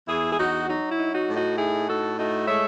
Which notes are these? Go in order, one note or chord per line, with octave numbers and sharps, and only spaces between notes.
E2 E4 G#4
G#4
E2 D#4 F#4
F#3 D#4
E4
D#4
D#4 F#4
A2
D#4 F#4
D#4 E4 G#4
A2 F#4 A4
A3 D#4 F#4
G#3 C#5 E5